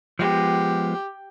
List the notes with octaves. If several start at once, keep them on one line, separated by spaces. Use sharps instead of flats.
F3 G#3 B3 G4